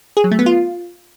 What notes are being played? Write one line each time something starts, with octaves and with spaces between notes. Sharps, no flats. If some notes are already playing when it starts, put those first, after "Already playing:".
G#4
F#3
A3
B3
F4